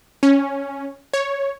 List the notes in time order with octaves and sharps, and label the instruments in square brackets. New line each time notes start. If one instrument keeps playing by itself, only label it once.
[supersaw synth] C#4
C#5